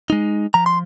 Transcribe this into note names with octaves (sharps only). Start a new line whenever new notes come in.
G#3 D#4
F3 A#5
C6